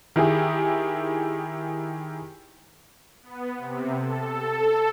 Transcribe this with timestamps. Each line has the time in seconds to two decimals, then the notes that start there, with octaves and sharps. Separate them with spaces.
0.16 D#3 E4 G4 G#4
3.22 B3
3.58 C3
3.97 A4